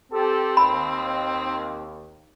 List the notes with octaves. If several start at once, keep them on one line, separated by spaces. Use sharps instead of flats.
C4 G4 A4
D#2 B5